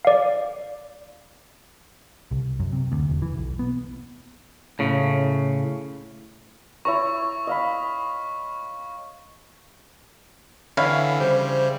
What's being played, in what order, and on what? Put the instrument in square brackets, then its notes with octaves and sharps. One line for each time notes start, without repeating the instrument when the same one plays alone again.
[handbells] D5 F5
[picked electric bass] C2
F#2
C3
D2
E1
E3
B1
B3
[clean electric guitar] A2 C#3
[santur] E4 C#5 A#5 [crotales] C#6
[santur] D#5 F5 B5
[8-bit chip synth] D3 E3 [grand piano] C#5 E5 B5 [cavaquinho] F5
[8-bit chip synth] C#3 G3 [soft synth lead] C5